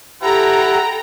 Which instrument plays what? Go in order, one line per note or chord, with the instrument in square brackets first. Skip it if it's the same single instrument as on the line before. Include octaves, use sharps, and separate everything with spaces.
[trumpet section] E4 B4 F#5 [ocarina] G4 [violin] A4 G5 [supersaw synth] A#5